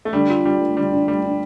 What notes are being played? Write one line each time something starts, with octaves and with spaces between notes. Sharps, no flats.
A3
D3 G3
F4
G3 D4
A3
D3 G3
D4
G3 A3
D4